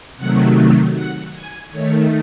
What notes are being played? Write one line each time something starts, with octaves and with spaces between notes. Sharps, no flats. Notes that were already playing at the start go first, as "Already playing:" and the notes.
C3 D#3 F#3 A3 F#5
F#5
G#5
D#3 A3 C#5